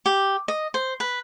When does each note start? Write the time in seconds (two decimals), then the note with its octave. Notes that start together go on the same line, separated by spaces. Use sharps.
0.06 G4
0.48 D#5
0.74 C5
1.00 B4